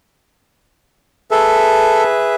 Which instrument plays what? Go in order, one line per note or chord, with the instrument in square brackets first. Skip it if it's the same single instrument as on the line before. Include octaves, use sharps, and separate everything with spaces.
[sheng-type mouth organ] G#4 B4 E5 [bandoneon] A4